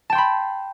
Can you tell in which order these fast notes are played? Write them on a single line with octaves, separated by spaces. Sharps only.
A5 G5 C6 B5